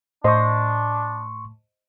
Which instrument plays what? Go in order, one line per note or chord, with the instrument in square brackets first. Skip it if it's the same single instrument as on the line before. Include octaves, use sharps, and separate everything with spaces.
[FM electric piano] A2 [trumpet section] D4 [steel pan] C5 D#5 [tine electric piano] C6 C#6